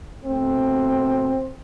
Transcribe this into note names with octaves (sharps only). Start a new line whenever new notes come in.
B2 A3 C4